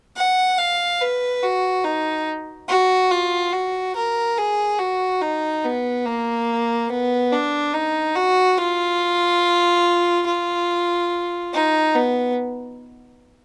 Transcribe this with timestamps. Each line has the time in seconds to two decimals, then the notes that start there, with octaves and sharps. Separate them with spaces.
0.16 F#5
0.58 F5
1.01 B4
1.43 F#4
1.85 D#4
2.69 F#4
3.11 F4
3.53 F#4
3.96 A#4
4.38 G#4
4.79 F#4
5.22 D#4
5.64 B3
6.05 A#3
6.89 B3
7.32 D4
7.74 D#4
8.16 F#4
8.58 F4
10.26 F4
11.53 D#4
11.95 B3